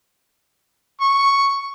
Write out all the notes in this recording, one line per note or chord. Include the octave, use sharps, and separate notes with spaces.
C#6